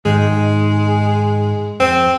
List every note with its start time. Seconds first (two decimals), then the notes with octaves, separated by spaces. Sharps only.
0.05 G#2 D#3 G#3 D#4
1.80 F2 C4